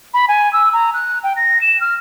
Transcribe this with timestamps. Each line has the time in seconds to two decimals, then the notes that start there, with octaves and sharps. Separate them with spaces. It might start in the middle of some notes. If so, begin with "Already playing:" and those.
0.14 B5
0.28 G#5
0.53 E6
0.73 A#5
0.94 F#6
1.23 G5
1.36 A#6
1.61 E7
1.81 F6